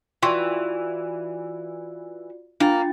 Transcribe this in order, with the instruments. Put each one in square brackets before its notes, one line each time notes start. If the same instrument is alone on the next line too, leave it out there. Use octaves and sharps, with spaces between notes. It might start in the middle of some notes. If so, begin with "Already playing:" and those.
[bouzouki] E3 [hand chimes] F4 F#4 D5 [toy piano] G5 C6 C#6
[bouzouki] A#3 [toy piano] D4 [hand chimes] F4 G5 A6